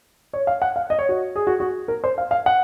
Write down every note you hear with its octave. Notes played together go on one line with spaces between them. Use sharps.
C#5
F5
F#5
F5
D#5
C#5
F#4
G#4
F#4
F#4
A#4
C5
F5
F5
F#5